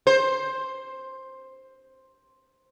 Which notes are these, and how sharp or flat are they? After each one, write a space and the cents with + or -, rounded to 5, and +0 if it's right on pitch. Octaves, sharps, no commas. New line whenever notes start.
C5 +10